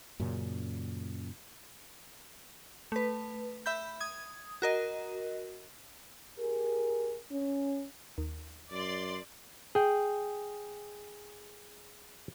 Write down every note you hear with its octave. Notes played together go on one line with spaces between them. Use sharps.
F#2 A#2 C#3 C#4
A3 B4
E5 B5 G6
D#6 G#6
F#4 A#4 D#5
G4 G#4 A#4
C#4
D#2
F#2 D5 C6
G#4 G5